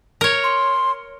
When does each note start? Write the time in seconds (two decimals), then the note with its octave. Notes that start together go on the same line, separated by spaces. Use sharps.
0.21 A#4 C#5
0.44 C6